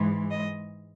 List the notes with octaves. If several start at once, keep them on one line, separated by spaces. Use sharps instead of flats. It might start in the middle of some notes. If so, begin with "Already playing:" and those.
Already playing: G#2 E3 G#3
D#5